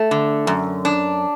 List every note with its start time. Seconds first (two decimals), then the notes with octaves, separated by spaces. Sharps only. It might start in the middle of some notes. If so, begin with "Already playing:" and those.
Already playing: A3
0.11 D3
0.47 F#2
0.85 D4